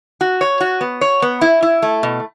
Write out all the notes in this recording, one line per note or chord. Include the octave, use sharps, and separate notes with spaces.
F#4
C#5
F#4
B3
C#5
B3
E4
E4
A3
B2